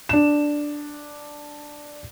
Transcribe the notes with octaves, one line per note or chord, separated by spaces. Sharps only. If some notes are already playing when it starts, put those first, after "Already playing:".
D4 E7